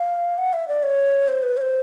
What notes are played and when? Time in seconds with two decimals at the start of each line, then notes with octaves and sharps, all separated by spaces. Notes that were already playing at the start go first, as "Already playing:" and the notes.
Already playing: F5
0.38 F#5
0.53 E5
0.68 D5
0.83 C#5
1.28 C5
1.43 B4
1.57 C#5
1.61 C5